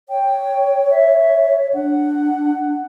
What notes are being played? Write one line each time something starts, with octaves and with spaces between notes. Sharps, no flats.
C#5 G5
E5
D4 F#5